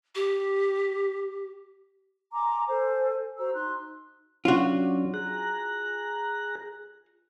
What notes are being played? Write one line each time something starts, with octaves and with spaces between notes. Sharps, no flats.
G4
G#5 A#5 C6 D6
A4 C5 G#5
F#4 C5 A#5 E6
D#4 C6 F#6
F#3 C#4 D4 F4 F#4
G#4 A#5 F#6